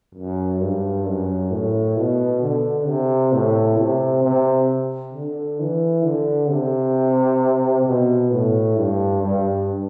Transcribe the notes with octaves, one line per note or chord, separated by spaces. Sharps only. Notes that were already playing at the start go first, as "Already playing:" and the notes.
F#2
G2
F#2
A2
B2
D3
C3
A2
C3
C3
D3
E3
D3
C3
B2
A2
G2
G2